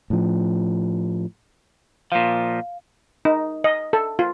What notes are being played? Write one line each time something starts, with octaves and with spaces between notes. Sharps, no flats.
A2 F3
A#2 F3 F5
D#4
D#5
A4
F4